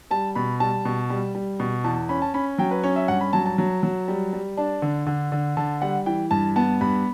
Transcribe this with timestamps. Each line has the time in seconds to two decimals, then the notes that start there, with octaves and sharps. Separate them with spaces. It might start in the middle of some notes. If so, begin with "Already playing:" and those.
0.11 G3 A5
0.35 B2 B5
0.60 G3 A5
0.85 B2
1.10 G3
1.35 G3
1.60 B2
1.84 E2 A5
2.09 C#4 B5
2.22 A5
2.34 C#4 B5
2.58 F#3 G5
2.71 B4
2.83 C#4 C#5
2.96 E5
3.08 G2 F#5
3.21 B5
3.33 F#3 A5
3.46 A5
3.58 F#3
3.83 F#3
4.08 G3
4.33 G3
4.57 D4 A5
4.82 D3
5.07 D3
5.32 D3
5.57 D3 A5
5.82 G3 F#5
6.06 E3 G5
6.31 G2 A5
6.56 B3 A5
6.81 G2 B5